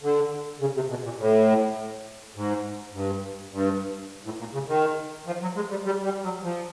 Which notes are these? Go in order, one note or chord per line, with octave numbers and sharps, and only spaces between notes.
D3
C#3
C3
B2
A#2
A2
G#2
G2
G2
A2
A#2
C#3
D#3
F3
F#3
G#3
G3
G3
G3
F#3
F3